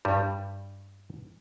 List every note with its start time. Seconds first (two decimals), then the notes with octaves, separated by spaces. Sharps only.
0.05 G2 G3